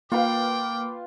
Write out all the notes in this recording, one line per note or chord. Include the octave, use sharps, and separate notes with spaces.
A#3 F4 B4 F5 G5 D6